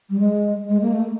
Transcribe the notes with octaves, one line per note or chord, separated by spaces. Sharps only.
G3
G#3
G#3
A#3
A3